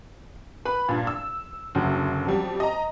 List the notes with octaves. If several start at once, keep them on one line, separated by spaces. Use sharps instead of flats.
B4 B5
G2 A#2
E6
F#1 D2 F#3
F2 F#3 G3
D#5 A#5